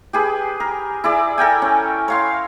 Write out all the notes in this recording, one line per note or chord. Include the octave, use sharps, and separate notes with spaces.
G4 G#4 B4
A#4
E4 G#4 D5
A4 A#4 G5 G#5
C#4
C#5 F5 C6